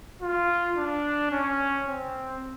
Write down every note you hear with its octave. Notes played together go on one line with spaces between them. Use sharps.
F4
D4
C#4
C4